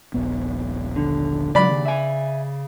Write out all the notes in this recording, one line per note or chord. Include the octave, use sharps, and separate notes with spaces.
D#1 A#1 B3
D3
G#2 C#3 F#3 D4 D5 B5
D#2
E5 G#5